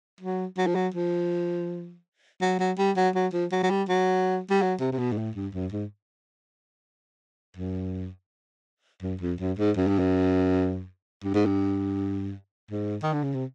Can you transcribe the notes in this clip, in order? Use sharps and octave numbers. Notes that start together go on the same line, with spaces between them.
F#3
F#3
F3
F#3
F3
F#3
F#3
G3
F#3
F#3
F3
F#3
F#3
G3
F#3
G3
F#3
C3
C3
B2
G#2
A2
G2
F#2
G#2
F#2
F#2
F2
F#2
G#2
F#2
G2
F#2
G2
G#2
G2
G#2
D#3
D3
C#3
C3